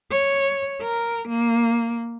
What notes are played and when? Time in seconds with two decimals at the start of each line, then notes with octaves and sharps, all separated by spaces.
0.11 C#5
0.82 A#4
1.29 A#3